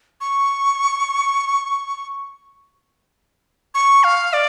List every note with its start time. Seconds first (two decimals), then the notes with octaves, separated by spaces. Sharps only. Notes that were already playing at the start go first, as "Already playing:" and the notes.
0.21 C#6
3.74 C#6
4.04 F5
4.33 D5